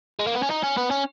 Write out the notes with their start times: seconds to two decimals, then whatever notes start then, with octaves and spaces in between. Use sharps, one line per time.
0.19 G#3
0.27 A#3
0.35 B3
0.42 C#4
0.50 D#4
0.63 C#4
0.77 B3
0.90 C#4